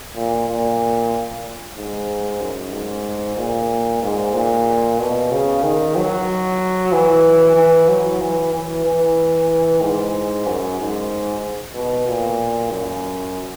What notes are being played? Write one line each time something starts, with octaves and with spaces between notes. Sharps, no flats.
A#2
A#2
G#2
F#2
G#2
A#2
G#2
A#2
B2
C#3
D#3
F#3
E3
E3
F#3
E3
E3
E3
G#2
F#2
G#2
B2
A#2
F#2